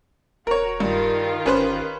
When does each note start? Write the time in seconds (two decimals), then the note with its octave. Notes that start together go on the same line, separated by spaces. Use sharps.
0.47 D#1 F#4 A#4 C#5
0.80 G2 D#3 F4 G4
1.46 G1 C#4 B4 C5